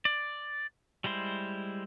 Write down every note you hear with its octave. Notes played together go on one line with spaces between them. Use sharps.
D5
G3 G#3 E4 C5